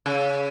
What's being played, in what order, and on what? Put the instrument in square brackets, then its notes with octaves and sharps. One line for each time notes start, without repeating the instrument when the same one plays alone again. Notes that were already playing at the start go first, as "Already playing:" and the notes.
[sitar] C#3